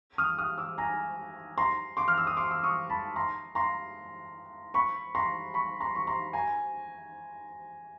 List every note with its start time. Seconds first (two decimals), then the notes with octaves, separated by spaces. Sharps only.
0.18 D#6 F6
0.38 D#6 F6
0.58 D6 E6
0.78 G#5 A#5
1.58 A#5 C6
1.97 C6 D6
2.08 F6
2.18 E6
2.27 D#6
2.37 C6 D6
2.51 E6
2.64 C#6 D#6
2.90 A5 B5
3.16 A#5 C6
3.55 A#5 C6
4.74 B5 C#6
5.15 A#5 C6
5.54 B5 C#6
5.80 A#5 C6
5.95 C#6
6.07 A#5 C6
6.33 G#5 A#5